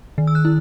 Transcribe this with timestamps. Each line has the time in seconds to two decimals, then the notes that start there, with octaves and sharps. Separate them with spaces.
0.18 D#3
0.27 E6
0.35 F#6
0.45 E4